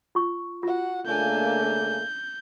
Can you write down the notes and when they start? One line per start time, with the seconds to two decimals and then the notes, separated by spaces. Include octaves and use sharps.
0.15 F4 C#6
0.63 F4 F#4 F#5
1.06 C#3 A3 A#3 D4 G#5 G6